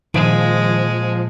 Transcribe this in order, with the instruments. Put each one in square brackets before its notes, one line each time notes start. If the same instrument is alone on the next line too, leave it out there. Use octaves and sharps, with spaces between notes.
[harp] A#2 [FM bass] D#3 [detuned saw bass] F3 [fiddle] G#3